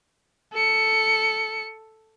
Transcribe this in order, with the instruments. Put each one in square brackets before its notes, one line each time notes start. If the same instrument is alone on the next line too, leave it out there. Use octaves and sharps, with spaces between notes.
[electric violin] A4 C#7